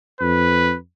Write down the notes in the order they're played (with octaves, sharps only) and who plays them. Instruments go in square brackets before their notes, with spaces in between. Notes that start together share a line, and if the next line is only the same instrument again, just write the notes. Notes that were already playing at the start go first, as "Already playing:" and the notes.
[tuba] F2 [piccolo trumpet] B4